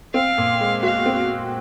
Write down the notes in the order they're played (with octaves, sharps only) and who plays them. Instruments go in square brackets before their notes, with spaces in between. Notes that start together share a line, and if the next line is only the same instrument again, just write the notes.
[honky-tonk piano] C4 [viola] F5
[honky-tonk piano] A#2
G#3
[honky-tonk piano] F#4 [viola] F5
[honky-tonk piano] C4